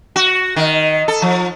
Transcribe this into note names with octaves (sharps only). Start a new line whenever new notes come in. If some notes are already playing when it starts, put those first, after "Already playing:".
F#4
D#3
A4
F3